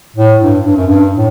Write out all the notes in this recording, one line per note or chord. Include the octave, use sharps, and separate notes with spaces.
A2
G2
G2
F#2
G2
A2